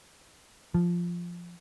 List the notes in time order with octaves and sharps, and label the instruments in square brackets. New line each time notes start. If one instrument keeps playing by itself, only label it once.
[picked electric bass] F3